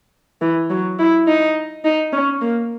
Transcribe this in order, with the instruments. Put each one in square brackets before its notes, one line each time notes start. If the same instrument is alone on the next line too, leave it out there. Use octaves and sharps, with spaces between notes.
[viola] E3
F#3
E4
D#4
D#4
C#4
A#3